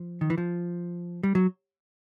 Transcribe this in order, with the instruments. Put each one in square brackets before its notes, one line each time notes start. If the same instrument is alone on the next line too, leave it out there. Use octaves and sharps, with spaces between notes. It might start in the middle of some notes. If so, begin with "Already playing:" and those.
Already playing: [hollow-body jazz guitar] F3
D#3
E3
F3
G3
F#3